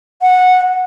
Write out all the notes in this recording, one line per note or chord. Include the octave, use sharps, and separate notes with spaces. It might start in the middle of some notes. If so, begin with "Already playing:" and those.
F#5